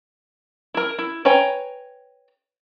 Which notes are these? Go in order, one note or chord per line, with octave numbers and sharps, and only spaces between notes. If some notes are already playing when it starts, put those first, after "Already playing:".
E4 A#4
E4
B4 C#5 G5 G#5 A#5